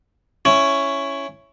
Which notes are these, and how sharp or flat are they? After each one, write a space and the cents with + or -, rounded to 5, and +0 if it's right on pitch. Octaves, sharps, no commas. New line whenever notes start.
C#4 +0 E4 +10 C#5 +0